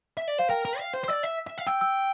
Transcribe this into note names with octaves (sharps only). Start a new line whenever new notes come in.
E5
D5
C5 F5
A#4 G5
A#4
F5
C5
C5
D5 E6
E5
E5
F5
G5 E6
E6